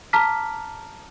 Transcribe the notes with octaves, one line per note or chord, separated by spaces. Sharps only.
A5 A#5 D6 F6 B6